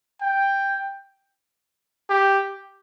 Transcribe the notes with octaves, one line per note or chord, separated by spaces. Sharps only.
G5
G4